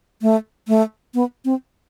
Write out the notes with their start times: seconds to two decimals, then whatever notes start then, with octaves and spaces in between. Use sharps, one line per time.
0.22 A3
0.68 A3
1.14 B3
1.45 C4